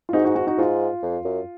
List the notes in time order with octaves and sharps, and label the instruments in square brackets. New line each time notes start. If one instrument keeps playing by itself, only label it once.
[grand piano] F4
[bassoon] G#2 [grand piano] D#4 F#4
[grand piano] D#4 F#4
D#4 F#4
D#4 F#4
[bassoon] G#2 [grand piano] F4
[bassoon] F2
F#2